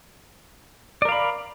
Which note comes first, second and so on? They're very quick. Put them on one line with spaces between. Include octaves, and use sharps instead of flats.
D5 A#4 F5 B5